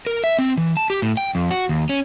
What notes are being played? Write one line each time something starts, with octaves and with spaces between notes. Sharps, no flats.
A#4
E5
C4
E3
A5
G4
A2
G5
F2
F#4
D#2
C#4